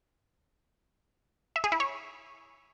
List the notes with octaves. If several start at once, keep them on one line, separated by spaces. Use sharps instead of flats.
E5
G#4
E4
C#5